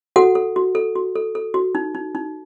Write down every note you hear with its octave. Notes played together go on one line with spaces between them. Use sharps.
F#4 A4 F#5
A4
F#4
A4
F#4
A4
A4
F#4
D#4
D#4
D#4